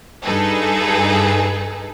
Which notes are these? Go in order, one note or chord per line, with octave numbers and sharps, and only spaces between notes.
G2 D#4 G#4 A4 B4